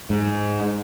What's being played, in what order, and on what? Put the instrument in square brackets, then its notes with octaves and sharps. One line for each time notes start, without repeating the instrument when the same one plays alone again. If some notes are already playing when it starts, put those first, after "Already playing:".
[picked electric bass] G#2